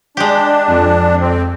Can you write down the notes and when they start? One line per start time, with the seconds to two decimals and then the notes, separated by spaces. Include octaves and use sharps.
0.17 G#3 D4 G4
0.67 F2
1.21 C4